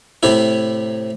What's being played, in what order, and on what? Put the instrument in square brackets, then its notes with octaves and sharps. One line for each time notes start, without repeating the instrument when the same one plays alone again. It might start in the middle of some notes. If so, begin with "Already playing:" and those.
[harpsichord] A2 C3 E4